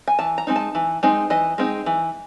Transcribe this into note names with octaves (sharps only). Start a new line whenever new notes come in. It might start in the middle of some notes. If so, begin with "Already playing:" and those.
G#5
E3 A5
A#5
G#3 C4 D#4
A5
E3
G#3 C4 D#4
E3 D#5
G#3 C4 D#4
E3